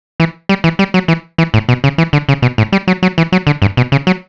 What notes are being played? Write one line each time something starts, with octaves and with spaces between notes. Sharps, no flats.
E3
G3
E3
G3
F#3
E3
E3
A2
B2
C#3
E3
D3
C#3
B2
A2
G3
F#3
F#3
E3
F#3
D3
G2
B2
C#3
F#3